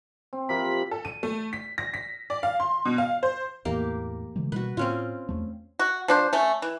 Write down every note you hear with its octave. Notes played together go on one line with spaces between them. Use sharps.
C4
C3 F3 A#4 B5
A4
D#7
A3
B6
A#6
B6
D5
F5
C6
B2
F5
C5
E2 A2 A#3 G4
C#3 E3 G#3
B2 G3 F#4 B4
A2 C4 C#4 F4
E2 A3
F#4
F3 D4 C5
A3 C#4
E3